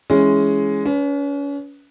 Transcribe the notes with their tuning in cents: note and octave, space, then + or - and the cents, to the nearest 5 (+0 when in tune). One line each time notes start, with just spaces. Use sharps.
E3 -5 G#3 +0 C#4 +0
C#4 +35 B4 +0